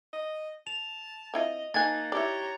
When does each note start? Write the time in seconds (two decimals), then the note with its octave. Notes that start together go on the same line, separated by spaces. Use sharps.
0.13 D#5
0.67 A5 F7
1.34 C4 E4 F4 D#5
1.74 F3 A#3 D#4 G#5 F#6 G#6 A6
2.12 E4 G4 C#5 D5 A#5